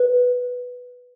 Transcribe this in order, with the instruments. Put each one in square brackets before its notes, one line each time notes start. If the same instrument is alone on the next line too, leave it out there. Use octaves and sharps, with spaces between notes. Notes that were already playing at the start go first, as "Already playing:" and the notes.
Already playing: [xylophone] B4